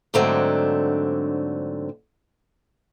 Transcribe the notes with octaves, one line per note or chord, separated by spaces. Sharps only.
G#2 D3 F#3 A3 C4 D4